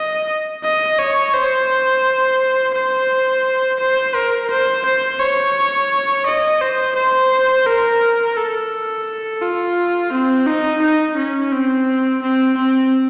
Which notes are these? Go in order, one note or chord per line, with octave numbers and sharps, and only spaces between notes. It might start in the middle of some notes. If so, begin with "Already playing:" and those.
Already playing: D#5
D#5
C#5
C5
C5
C5
A#4
C5
C5
C#5
D#5
C5
C5
A#4
A4
F4
C4
D#4
D#4
C#4
C4
C4
C4